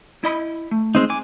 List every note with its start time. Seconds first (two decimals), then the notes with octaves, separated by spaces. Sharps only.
0.24 E4 D#5 B5
0.71 A3
0.95 G#3 C4 D#4
1.10 G#5 D6